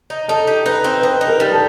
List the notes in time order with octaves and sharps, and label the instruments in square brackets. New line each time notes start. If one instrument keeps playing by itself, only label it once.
[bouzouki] D#4
[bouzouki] D#4 [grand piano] A4
[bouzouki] G4
[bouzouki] D#4 [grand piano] B4
[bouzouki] C4
[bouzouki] D#4 [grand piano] B4
[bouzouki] D#4
[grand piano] A#4
[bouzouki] G3
[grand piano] A4